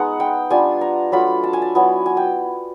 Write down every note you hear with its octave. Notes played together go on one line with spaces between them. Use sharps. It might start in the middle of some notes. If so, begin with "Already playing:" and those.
Already playing: G#3 B3 D#4 F#5
G5
G3 B3 D4 F4 G#5
A#5
F#3 A3 D4 F4 B5
A5
G#5
A5
F#3 B3 E4 G#5
G#5
G5